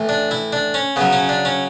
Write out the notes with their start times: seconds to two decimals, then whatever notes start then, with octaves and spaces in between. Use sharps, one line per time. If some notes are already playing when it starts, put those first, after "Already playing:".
Already playing: A2 E3
0.09 D4
0.31 E4
0.53 D4
0.74 C#4
0.96 C#3 F#3 B3
1.13 C#4
1.29 D4
1.45 C#4